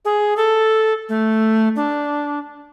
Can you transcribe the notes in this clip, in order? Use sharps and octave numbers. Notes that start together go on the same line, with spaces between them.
G#4
A4
A3
D4